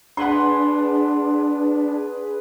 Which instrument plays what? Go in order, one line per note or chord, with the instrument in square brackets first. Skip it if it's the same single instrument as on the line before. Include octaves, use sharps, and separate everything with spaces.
[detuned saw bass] D4 [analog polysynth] G#4 B4 [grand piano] F#5 C6